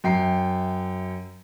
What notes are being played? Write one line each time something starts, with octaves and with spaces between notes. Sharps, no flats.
F#2 G5 C7